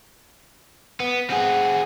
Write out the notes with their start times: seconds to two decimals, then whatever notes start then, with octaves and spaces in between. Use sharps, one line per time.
1.00 B3
1.30 C4 G#4 F#5